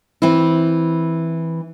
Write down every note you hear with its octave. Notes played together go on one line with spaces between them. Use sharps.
E3 C4 E4